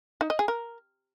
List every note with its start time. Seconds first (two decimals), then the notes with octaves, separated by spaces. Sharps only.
0.21 D#4
0.30 D#5
0.39 G#4
0.48 A#4